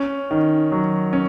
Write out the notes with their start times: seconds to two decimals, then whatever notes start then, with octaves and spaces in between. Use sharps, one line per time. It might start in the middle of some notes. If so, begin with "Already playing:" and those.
Already playing: C#4
0.31 D#3
0.72 F#3
1.13 C#4